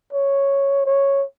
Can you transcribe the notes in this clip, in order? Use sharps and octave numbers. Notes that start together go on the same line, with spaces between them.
C#5
C#5